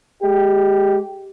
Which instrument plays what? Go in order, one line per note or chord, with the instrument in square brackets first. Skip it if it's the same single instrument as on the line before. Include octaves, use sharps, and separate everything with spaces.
[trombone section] G#3 G4